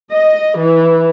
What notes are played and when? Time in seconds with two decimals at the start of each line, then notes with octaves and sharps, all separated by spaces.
0.11 D#5
0.57 E3